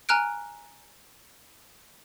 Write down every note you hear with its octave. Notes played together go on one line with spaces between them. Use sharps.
G#5 A#5 F6 F#6 D7